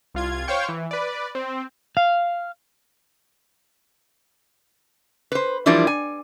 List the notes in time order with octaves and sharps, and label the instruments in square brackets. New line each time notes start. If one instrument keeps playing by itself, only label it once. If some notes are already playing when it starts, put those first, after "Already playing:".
[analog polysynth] C2 F4 G#6
C5 C#5 F5 G5 C#6
E3
B4 D5
C4
[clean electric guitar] F5
[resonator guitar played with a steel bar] B4 C5
E3 F3 G3 D4 E4 A#4
G#5